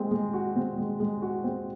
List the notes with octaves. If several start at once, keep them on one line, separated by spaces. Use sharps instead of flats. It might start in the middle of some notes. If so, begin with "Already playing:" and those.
Already playing: G#3 C4
G#3
F#4
C4
G#3
G#3
F#4
C4